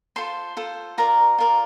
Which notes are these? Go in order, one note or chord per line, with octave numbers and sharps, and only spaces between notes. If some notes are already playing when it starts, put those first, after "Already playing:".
F4 A4 C5 C6
F4 A4 C5
F4 A#4 D5 A#5
F4 A#4 D5